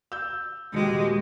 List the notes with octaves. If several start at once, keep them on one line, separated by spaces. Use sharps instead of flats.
E6 G6
D#1 G#3 F#4 G4